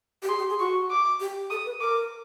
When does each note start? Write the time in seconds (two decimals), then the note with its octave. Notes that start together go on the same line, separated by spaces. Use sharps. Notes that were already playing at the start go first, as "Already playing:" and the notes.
0.22 G4
0.29 G#4 C6
0.39 G4
0.49 G#4
0.60 F#4 C#6
0.90 D6
1.20 G4
1.50 A4 D#6
1.66 B4
1.81 A#4 D6